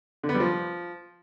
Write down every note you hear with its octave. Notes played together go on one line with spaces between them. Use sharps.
D3
B3
G3
F3